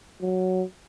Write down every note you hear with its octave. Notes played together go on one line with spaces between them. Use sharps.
F#3